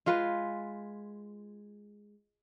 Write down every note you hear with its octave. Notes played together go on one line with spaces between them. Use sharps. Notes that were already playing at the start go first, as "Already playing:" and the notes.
G#3 F4 B4